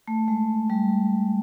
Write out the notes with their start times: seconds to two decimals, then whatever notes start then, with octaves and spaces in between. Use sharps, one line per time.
0.07 A3
0.28 G#3
0.70 G3